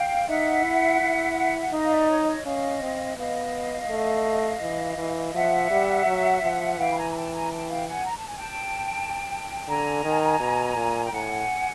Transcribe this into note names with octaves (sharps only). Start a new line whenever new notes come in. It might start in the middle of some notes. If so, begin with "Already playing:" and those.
Already playing: F5 G5
D#4 E5 F#5
E4
E4
F#5
D#4 D#5 F5
F5
D5 E5
E5
C#5 D#5
C#5 D#5
C#4 D#5 F5
C4
B3 D#5 F5
A3
E3
E3
F3 E5 F#5
G3
F#3
F3
E3 F5 G5
B5
G#5 A#5
A#5
G5 A5
G#5 A#5
G5 A5
F5 G5
F#5 G#5
A#5
A5
G#5
G5 A5
D3 G#5 A#5
D#3
B2
A#2
G5
A2 F#5 G#5